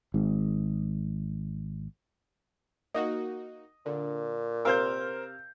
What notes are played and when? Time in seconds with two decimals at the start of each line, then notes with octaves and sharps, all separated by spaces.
0.14 G#1 G#2
2.94 A#3 D#4 F#4 D#5
3.86 A#2 D3
4.65 C3 A#4 C5 F5 E6 G6